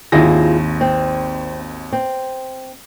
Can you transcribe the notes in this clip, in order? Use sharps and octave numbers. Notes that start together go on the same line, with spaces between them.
G#1 D#2 E4 F4 G#4 A#6
C4
C4